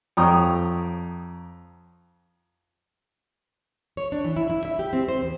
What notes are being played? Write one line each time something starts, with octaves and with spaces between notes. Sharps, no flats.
F2 G5 A#5 C#6 D#6
C#5
D4
E3
E4
E4
E5
G4
C4
C5
E2